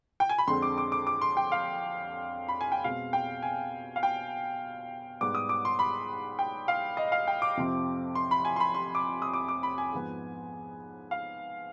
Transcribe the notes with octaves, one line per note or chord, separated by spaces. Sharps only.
G5
G#5
B5
F2 D3 G#3 C4 C6
D6
D6
D6
D6
C6
G5
F5
B5
G#5
G5
B2 G#3 C4 F5
G5
G#5
F5
G5
G#2 G3 B3 D6
D#6
D6
C6
B5
G5
F5
D#5
F5
G5
D6
F2 C3 F3 C4
C6
B5
G#5
C6
B5
C6
D6
D#6
D6
D6
B5
G#5
G#2 F3 B3
F5